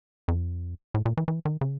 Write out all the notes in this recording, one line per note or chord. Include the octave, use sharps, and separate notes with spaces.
F2
A2
A#2
E3
E3
D#3
C#3